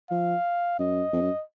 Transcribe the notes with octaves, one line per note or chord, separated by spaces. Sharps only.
F3 F5
F#2 D#5
F2
F#2